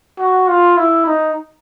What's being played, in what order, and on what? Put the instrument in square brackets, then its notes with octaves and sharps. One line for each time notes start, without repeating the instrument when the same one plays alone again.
[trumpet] F#4
F4
E4
D#4